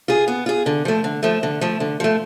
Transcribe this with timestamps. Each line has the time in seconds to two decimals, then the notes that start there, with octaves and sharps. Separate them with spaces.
0.08 F4 G#4
0.28 B3
0.46 F4 G#4
0.66 D3
0.85 F3 A3
1.04 D3
1.23 F3 A3
1.43 D3
1.61 F3 A3
1.80 D3
2.00 F3 A3